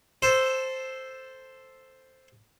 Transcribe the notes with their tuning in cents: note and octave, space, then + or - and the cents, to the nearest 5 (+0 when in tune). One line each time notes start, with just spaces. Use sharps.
A4 +0 C5 +0